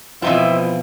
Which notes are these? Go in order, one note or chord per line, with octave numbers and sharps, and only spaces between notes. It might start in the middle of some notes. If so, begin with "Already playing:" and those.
B2 E3 F3 C4 E4 F4 C5 D#5